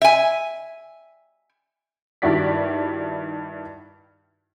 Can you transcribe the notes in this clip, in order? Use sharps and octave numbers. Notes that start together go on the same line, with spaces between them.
E5 G#5
G2 D#3 E4 F#4 D5 B6